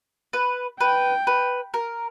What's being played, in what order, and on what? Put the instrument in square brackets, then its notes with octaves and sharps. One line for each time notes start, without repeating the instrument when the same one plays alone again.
[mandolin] B4
[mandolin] B4 [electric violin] G5
[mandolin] B4
A#4